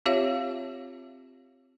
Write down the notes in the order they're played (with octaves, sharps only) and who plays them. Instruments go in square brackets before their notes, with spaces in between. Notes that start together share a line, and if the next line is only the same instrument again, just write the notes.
[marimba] C4 F4 G4 C#5 E5 F5